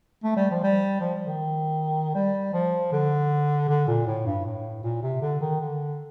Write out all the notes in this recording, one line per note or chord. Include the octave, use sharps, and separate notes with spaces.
A3
G3
F3
G3
F3
D#3
G3
F3
D3
D3
A#2
A2
G2
A2
A#2
C3
D3
D#3
D3